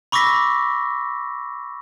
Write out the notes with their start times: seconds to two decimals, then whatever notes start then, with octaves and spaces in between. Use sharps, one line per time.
0.12 B5 C#6 D6 E6 A#6 B6